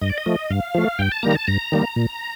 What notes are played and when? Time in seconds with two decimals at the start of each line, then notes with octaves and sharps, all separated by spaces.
0.01 G2 D#5
0.10 D5
0.18 D#5
0.26 F3 A3
0.50 G2 F5
0.75 F3 A3
0.99 G2 G5
1.11 A5
1.23 D#3 G3 A#3 A#5
1.35 A5
1.47 G2 A#5
1.72 D#3 G3 A#3
1.96 A#2